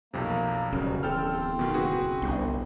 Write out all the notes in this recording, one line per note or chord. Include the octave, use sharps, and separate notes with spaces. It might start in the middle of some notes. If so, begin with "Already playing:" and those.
B1 F2 C3 A#3
D1 F#2 C#3 G3
E2 C4 A4 G5 F6
B1 B2 D#3
F#1 F#4 G#4 B4
G1 C2